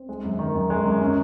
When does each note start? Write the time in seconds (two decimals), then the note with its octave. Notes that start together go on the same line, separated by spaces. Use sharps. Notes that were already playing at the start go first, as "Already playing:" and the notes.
Already playing: C4
0.09 G#3
0.24 F#2
0.39 D#3
0.55 F#2
0.70 G#3
0.85 F#2
1.01 C#4